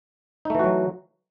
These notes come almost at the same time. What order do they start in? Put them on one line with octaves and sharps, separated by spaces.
D#4 A3 E3 F#4 F#3